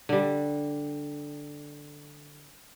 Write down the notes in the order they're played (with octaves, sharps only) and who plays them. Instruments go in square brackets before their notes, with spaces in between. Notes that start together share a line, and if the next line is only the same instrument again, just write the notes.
[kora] D3 G3